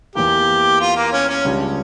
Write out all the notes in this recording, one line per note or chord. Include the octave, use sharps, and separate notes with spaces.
E2 E3 A#3 G4
F4
A#3
C#4
C#4
C#2 C#3 G3 D4 F4